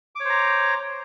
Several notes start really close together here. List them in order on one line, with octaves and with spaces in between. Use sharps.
D6 C#5 C5 A#5